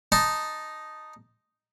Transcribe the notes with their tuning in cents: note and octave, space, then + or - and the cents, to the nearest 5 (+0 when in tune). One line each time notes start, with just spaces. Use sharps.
D#4 +0 A5 +0 C6 +0